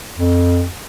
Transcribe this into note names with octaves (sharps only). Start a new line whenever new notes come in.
F2